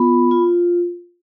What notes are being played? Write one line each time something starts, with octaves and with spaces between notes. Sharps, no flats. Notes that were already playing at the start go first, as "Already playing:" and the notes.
Already playing: B3 F4 B5
F4